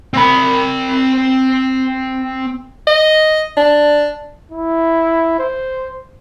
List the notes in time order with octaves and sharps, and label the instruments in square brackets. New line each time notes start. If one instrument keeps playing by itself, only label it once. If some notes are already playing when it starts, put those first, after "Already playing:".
[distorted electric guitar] C4 B5
[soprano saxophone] D#5
D4
[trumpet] E4
C5